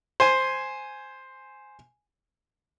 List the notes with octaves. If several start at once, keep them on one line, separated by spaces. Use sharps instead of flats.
C5 G#5